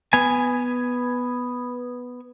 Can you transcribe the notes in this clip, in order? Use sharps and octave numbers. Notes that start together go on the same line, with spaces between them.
B3 G#5